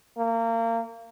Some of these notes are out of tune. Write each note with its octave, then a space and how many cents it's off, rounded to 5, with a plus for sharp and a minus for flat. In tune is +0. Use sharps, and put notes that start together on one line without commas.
A#3 -30